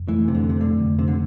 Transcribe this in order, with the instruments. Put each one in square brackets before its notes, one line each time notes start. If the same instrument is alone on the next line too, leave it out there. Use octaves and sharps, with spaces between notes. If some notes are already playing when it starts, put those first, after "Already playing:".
Already playing: [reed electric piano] F2
[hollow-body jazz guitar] E3 [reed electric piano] A3
[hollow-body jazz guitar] C3
[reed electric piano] F2 [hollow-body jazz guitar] D3
[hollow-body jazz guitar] C3
[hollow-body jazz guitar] D3 [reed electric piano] A3
[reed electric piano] F2
[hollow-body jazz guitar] C3
D3